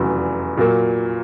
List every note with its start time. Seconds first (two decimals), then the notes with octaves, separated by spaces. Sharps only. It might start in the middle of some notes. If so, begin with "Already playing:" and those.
Already playing: F1 E2 C#3 F#3
0.57 A#2 F#3 A#3